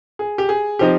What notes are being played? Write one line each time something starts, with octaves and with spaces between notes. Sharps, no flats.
G#4
G4
G#4
F3 C4 D#4 G4